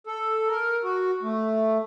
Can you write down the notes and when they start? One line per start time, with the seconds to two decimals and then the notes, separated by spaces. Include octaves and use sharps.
0.07 A4
0.48 A#4
0.84 F#4
1.22 A3